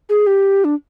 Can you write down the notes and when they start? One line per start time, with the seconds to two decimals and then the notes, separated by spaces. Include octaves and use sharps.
0.09 G#4
0.27 G4
0.64 D4